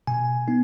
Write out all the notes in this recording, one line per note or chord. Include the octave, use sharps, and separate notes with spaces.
B2 G#5
B3 D#4